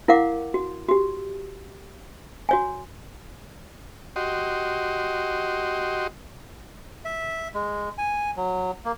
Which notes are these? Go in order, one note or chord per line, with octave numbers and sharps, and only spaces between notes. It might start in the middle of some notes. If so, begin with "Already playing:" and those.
E4 A#4 F5 F#5 D6
F#4
F#4 G4
F#4 C#5 G#5
F#4 G4 D#5 C6
E5
G#3
G#5
F#3
A#3